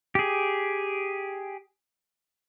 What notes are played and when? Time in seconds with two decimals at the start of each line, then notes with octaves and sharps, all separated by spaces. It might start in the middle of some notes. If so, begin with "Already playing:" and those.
0.15 G4 G#4